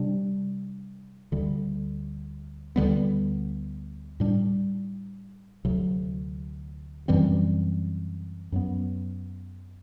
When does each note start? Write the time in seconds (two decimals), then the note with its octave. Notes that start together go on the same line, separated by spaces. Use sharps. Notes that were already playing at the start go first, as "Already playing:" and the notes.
Already playing: C3 G3 D4
1.32 D2 D3 G3
2.76 D2 D3 G3 B3
4.20 A2 G3 D4
5.65 D2 C3 F#3
7.08 F#2 E3 G3 C4
8.52 F#2 F#3 B3